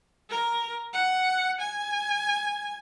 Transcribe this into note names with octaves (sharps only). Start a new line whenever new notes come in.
A#4
F#5
G#5